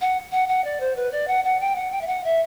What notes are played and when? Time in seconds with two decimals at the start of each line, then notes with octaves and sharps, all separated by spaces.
0.01 F#5
0.32 F#5
0.48 F#5
0.64 D5
0.80 C5
0.95 B4
1.11 D5
1.27 F#5
1.44 F#5
1.60 G5
1.75 F#5
1.91 G5
2.01 E5
2.07 F#5
2.23 E5